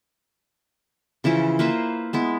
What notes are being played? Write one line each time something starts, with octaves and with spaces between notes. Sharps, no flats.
C#3 E3 F3 E4
A#3 B4 C5 E5
G#3 B3 E4